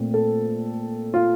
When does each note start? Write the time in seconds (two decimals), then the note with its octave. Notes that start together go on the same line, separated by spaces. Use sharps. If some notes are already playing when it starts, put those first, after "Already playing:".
Already playing: A#2 A3 C4
0.14 A4
1.14 F4